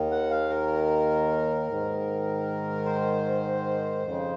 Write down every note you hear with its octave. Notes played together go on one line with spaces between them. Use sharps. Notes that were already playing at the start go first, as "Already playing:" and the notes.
Already playing: D#2 D#3
F#5
F5
A#4
G#2 D#3
C5
F2
C#3